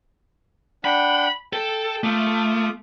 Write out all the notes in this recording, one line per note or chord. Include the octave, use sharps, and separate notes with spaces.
D4 F#5 G5 B5
A4 G5 A5
A3 F4 D6 D#6